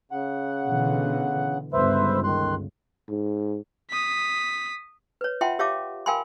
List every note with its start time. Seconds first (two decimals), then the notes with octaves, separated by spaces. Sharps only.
0.12 C#3 F#5
0.66 B2 D3 E3
1.73 G1 C#2 B4 C5 E5
2.24 D#3 C6 F#6
3.09 G#2
3.90 D#6 B6
5.21 B4 C#5
5.41 F4 E5 F#5 G5 A5 C6
5.59 G4 C#5 E5 F5 A5 D6
6.06 A#4 F5 G5 G#5 B5 C6